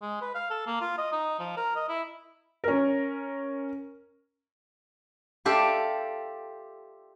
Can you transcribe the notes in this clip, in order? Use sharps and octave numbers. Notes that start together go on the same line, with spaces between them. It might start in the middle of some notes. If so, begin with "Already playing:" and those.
G#3
B4
F5
A4
A#3
F4
D#5
D#4
F3
A#4
D#5
E4
C#4 A#4
F4 G4 A4 D5 E5